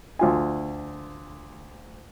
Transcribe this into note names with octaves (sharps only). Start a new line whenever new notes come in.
D2 F4 G#5